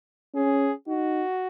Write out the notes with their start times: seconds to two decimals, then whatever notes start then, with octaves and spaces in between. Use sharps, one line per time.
0.35 C#4 G#4
0.87 D#4 F#4